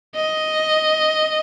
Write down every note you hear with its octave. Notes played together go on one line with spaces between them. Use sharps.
D#5